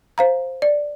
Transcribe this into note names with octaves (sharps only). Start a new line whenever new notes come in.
C5 F5 A#5
D5